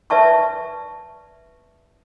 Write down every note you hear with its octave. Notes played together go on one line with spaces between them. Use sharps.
B4 D5 E5 A5 C#6